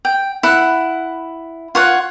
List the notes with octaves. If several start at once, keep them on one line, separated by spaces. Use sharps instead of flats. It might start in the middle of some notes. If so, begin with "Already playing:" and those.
G5
E4 F#5
F4 C#5 F#5